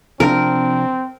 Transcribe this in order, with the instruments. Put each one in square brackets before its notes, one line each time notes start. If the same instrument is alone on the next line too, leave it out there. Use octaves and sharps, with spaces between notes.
[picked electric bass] C3 F3 D4 [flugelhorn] C4 [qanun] A#4